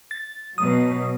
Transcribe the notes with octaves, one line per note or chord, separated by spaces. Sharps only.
A6
B2 F#3 D#6